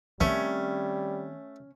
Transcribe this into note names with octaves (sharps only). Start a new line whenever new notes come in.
D#3 G3 A3 C4 C#4